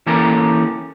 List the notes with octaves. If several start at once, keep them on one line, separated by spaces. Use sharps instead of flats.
E3 A#3 C#4 G4 A4 A#4